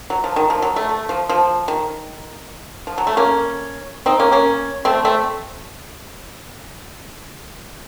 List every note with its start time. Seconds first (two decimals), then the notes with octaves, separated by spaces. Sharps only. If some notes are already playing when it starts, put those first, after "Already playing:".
0.10 F#3
0.24 F3
0.36 D#3
0.50 F3
0.62 F#3
0.76 A3
0.89 A3
1.09 F3
1.29 F3
1.68 D#3
2.87 F3
2.98 F#3
3.07 A3
3.17 A#3 C#4
4.06 C4 D#4
4.20 A#3 C#4
4.32 A#3 C#4
4.85 A3 C4
5.05 A3 C4